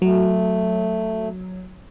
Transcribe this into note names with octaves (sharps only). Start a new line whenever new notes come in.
F#3 A3